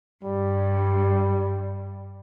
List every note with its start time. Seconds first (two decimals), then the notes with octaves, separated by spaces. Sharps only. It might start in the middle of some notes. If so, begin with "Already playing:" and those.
0.25 G2 G3